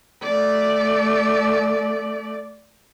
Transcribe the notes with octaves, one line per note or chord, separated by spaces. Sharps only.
A3 D5